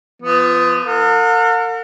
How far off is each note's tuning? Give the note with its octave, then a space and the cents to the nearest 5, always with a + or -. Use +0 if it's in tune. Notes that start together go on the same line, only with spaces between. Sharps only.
F3 -20 B3 +20
A#4 -45 F#5 -45